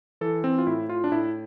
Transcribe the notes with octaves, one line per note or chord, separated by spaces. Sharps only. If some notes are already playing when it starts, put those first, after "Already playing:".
E3 A4
C4
F4
A2 E4
F4
D4
A2 E4